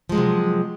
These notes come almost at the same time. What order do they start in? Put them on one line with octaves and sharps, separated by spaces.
F3 G#3 F#3 C3